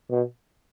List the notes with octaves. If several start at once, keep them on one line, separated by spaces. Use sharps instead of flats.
B2